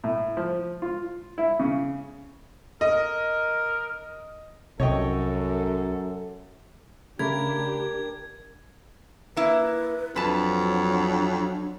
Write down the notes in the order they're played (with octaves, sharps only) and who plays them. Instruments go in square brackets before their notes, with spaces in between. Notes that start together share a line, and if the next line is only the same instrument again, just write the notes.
[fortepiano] A2
F3
F4
E4
C#3
[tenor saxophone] A#4 [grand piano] D#5
[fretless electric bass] C2 C3 [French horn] F#2 [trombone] A4 [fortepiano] C#5 D#5 G5
[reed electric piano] C#3 A3 B5 [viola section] D4 G4 [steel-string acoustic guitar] A#4 [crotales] G#6
[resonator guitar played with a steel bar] A#3 E4 [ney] B4
[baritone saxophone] F2 [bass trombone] F#3 [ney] D4 [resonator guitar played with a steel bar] B4 A5